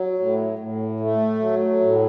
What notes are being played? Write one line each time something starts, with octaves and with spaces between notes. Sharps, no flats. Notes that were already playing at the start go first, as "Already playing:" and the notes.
Already playing: F#3
A2
A2
A3
F#3
A2